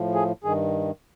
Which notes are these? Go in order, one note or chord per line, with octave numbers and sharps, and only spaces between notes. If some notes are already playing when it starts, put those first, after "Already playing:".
Already playing: A2 F3
G#4
G2 D#3 G#4